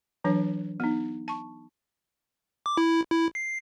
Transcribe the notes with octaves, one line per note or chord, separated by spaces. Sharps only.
E3 F#3 D4 C#5
B3 D#4
A5 C#6
D6
E4
E4
C7